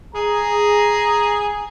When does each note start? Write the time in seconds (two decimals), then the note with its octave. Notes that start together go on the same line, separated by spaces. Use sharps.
0.14 G#4 A#5